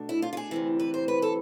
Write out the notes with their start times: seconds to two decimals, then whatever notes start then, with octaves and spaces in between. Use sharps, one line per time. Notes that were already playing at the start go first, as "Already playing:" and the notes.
Already playing: B2 A3 D4
0.09 E4
0.22 F4
0.33 F4
0.37 G#4
0.51 D2 C3 E3
0.80 B4
0.94 C5
1.08 B4
1.22 A4